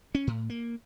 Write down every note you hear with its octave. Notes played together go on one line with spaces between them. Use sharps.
C#4
A2
A#3